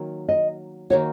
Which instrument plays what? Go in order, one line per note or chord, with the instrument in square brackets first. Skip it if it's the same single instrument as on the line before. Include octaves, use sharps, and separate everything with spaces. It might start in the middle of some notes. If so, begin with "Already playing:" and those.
Already playing: [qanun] D#3 F#3 A#3
[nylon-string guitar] D#5
[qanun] D#3 A#3 D#4 F#4 [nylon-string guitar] C#5